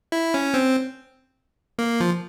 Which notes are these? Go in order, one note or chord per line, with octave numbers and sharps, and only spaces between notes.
E4
C#4
C4
A#3
F3